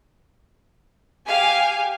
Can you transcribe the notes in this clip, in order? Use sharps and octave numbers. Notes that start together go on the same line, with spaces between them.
G4 F5 G#5